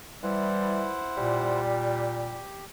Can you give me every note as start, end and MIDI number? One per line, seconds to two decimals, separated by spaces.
0.23 0.98 52
0.23 0.92 55
0.23 1.61 64
0.23 1.61 72
0.23 1.61 78
1.17 2.45 46
1.17 2.44 55
1.64 2.65 67